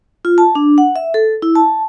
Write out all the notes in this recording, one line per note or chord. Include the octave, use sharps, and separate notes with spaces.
F4
A5
D4
F#5
E5
A4
E4
A5